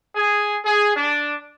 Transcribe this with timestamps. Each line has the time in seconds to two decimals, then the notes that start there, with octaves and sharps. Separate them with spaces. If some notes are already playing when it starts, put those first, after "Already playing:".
0.15 G#4
0.64 G#4
0.95 D4